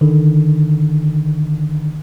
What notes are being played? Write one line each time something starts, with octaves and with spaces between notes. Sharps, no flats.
D3 D#3